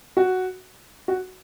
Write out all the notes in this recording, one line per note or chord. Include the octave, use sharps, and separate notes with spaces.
F#4
F#4